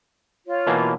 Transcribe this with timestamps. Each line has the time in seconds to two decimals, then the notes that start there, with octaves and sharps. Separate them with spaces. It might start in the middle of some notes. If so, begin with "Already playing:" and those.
0.47 F4 C#5
0.67 B2 E3 A#3